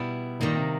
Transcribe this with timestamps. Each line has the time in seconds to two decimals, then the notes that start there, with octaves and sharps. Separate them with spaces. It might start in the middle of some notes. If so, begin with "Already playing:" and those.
Already playing: B2 G3 B3 E4
0.40 A#2 D#3 G3 A#3 D#4
0.55 C3